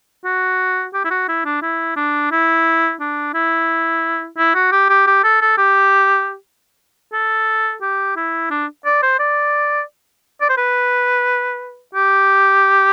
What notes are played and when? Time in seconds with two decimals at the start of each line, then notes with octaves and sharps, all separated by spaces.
0.25 F#4
0.94 G4
1.04 E4
1.10 F#4
1.28 E4
1.45 D4
1.62 E4
1.96 D4
2.31 E4
3.00 D4
3.34 E4
4.37 E4
4.55 F#4
4.72 G4
4.89 G4
5.07 G4
5.23 A4
5.41 A4
5.57 G4
7.13 A4
7.81 G4
8.16 E4
8.50 D4
8.85 D5
9.02 C5
9.19 D5
10.41 D5
10.49 C5
10.57 B4
11.95 G4